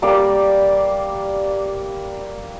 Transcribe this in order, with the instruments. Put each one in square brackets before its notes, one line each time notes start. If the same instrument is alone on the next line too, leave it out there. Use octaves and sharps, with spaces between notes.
[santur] G3 A#3 D5